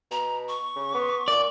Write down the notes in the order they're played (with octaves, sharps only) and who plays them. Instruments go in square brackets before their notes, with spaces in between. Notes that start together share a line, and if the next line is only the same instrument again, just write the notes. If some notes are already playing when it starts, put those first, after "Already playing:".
[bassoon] B2 [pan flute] A#5
[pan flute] C#6
[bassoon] C#3
B3
[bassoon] A#2 [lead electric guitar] D5